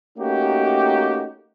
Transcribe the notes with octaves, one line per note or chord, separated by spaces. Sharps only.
A3 A#3 C#4 D#4 F#4 G4